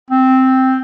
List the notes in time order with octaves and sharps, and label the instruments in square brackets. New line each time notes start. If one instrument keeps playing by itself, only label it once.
[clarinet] C4